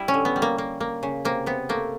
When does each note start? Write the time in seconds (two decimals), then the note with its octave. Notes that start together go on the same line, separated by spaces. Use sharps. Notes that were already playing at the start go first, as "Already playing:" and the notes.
Already playing: G3 E4
0.08 C#4
0.14 D3
0.25 B3
0.36 G3
0.42 A#3
0.58 A#3
0.80 A#3
1.03 C#3
1.25 C3 A#3
1.46 C3 B3
1.69 A3 A#3